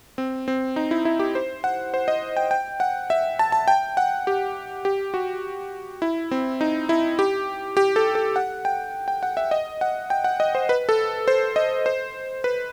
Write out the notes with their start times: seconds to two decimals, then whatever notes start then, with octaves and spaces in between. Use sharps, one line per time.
0.18 C4
0.48 C4
0.76 D#4
0.91 E4
1.05 E4
1.19 G4
1.35 C5
1.64 F#5
1.94 C5
2.08 D#5
2.37 G5
2.51 G5
2.80 F#5
3.10 E5
3.39 A5
3.52 A5
3.68 G5
3.97 F#5
4.27 G4
4.85 G4
5.14 F#4
6.02 E4
6.31 C4
6.61 D#4
6.89 E4
7.19 G4
7.77 G4
7.96 A4
8.15 A4
8.36 F#5
8.65 G5
9.08 G5
9.23 F#5
9.37 E5
9.51 D#5
9.81 F#5
10.10 G5
10.24 F#5
10.40 D#5
10.55 C5
10.69 B4
10.89 A4
11.28 C5
11.56 D#5
11.86 C5
12.44 B4